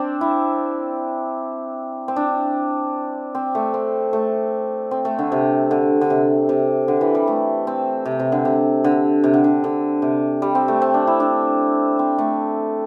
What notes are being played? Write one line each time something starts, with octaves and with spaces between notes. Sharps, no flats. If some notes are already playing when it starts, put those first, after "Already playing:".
Already playing: C4 D4
E4
C4
D4
C4
A3
C4
A3
C4
A3
D3
C3
D3
D3
C3
C3
D3
E3
G3
A3
C4
C3
C3
D3
C3
D3
C3
D3
D3
D3
C3
G3
C4
A3
C4
D4
E4
D4
C4
A3